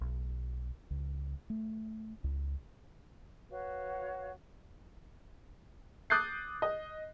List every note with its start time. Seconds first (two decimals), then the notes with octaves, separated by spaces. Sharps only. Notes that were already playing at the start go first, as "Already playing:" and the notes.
0.01 B1
0.91 C#2
1.50 A3
2.24 C#2
3.50 F#4 B4 C#5 F5
6.10 D6 D#6 F#6 G6 A6 C7
6.62 D#5